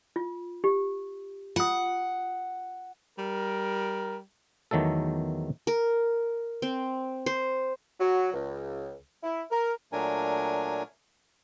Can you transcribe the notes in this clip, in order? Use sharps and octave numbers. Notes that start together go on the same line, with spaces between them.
F4
G4
F4 F#5 D#6
G3 A#4
E2 D#3 F#3 A3 A4
A#4
C4
C5
F#3
C#2
E4
A#4
A#2 F#3 A3 D4 A#4 G#5